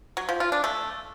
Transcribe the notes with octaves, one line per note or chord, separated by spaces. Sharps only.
F#3
F3
F4
D4
A3